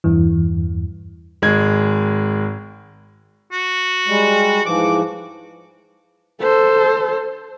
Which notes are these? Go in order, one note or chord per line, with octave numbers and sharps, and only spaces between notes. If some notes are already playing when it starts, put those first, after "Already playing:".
E2 G2 E3
G#1 G#3 G#6
F#4
G3 G#3
G#2 E3 F3 D6
A4 C5